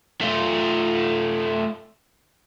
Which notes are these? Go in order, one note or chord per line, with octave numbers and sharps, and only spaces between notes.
A3 F4